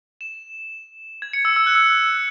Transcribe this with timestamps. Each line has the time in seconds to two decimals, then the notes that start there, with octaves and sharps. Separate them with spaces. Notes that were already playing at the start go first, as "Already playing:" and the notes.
0.21 E7
1.22 G#6
1.33 C#7
1.45 E6
1.56 E6
1.66 F#6
1.75 E6